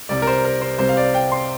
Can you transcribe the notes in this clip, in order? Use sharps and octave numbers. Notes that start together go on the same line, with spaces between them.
C2 C3 G3 D5
A#4
C5
A#4
C5
C2 C3 G3 C5
F5
D5
G5
C6